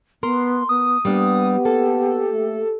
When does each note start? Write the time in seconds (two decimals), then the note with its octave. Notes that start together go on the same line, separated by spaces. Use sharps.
0.23 B3 A#4 C6
0.69 B3 D#6
1.05 G3 A#3 B3 D4 G4
1.65 A#3 A4
2.33 A3